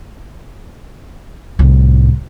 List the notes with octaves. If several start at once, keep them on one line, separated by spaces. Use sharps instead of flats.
C2 A2